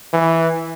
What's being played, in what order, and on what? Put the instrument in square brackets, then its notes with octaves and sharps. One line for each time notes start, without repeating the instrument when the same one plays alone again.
[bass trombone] E3